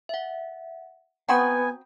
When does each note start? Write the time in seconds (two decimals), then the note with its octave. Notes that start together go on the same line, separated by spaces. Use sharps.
0.09 E5 F#5
1.29 B3 C4 F#4 G#5 A#5 B5 D#6 G6